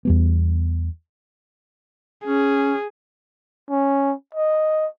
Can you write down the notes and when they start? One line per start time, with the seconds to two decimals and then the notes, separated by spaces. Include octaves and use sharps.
0.05 E2 G3 B3
2.25 C#4 G#4
3.70 C#4
4.34 D#5